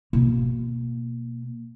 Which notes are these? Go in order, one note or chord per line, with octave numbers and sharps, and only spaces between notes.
B2 A#3